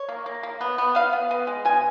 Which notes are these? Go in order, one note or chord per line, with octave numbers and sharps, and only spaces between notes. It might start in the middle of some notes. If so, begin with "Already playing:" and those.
Already playing: C#5
A#3
A#3
A#3
B3
B3
B3 F5
B3
B3
G#3
B2 G#5